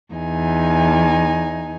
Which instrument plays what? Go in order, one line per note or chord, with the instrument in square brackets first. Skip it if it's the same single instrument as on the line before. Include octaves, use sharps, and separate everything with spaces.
[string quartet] E2 D#4 G#5